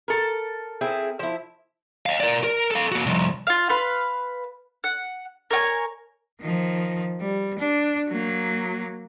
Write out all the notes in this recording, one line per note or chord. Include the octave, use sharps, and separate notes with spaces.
A4 A#4
C4 E4 G#4
F3 E4
D#5 F5
A#4 D5
A#4
A4 F5
A#3 F#4
C2 F2
F4 F5
B4 F5 C6
F#5
A#4 C#5 G5 G#5
D#3 F3
G3
D4
F#3 A#3